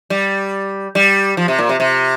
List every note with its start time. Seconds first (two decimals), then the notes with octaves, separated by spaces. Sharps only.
0.10 G3
0.95 G3
1.37 F3
1.48 C3
1.59 A#2
1.69 C3
1.80 C3